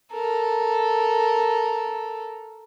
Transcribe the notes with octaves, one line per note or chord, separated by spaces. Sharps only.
A4 A#4